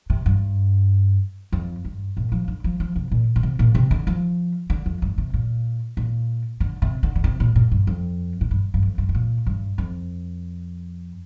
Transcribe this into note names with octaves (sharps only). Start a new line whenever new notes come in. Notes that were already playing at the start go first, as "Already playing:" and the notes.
C3
G2
F2
G2
A#2
F3
D3
F3
F3
C3
A#2
A#2
C3
A#2
C3
D3
F3
D3
F2
G2
C3
A#2
A#2
D3
C3
D3
D3
C3
A#2
A#2
G2
F2
A#2
G2
G2
F2
G2
G2
A#2
G2
F2